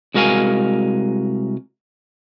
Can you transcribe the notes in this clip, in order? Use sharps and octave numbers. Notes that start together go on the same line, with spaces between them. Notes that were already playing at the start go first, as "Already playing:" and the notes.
C2 G#3 F#4 A#4 F5 G#5